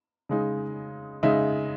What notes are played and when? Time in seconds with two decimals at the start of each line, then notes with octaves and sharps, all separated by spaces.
0.29 C#3 G#3 D#4
1.23 C#3 G#3 D#4 E5